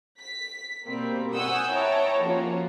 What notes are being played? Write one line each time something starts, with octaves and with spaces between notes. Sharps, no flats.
B6
B2 G3 A#3 C4
F#5 G#5 C#6 D#6 E6 G6
E4 C#5 G5 A5 A#5
F3 A#3 C#4 F4 F#4